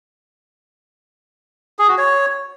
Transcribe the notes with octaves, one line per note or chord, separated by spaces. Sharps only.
G#4
F#4
C#5